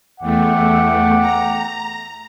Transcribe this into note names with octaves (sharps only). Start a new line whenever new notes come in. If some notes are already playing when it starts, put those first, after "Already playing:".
E2 A3 F#5 G5 D6
A#5